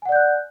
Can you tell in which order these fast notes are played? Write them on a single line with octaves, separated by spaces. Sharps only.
G#5 F#5 D5 G6 F#6